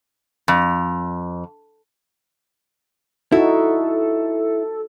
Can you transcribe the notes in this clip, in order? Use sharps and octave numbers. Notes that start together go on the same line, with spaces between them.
F2
D#4 E4 F#4 A4